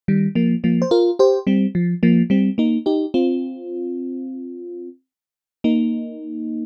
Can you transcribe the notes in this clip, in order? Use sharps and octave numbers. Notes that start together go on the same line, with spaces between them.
D#3 G3
F3 A#3
F3 A#3
C5
F4 A#4
G4 C5
G3 C4
F3
F3 A#3
G3 C4
A#3 D#4
D#4 G4
C4 F4
A#3 D#4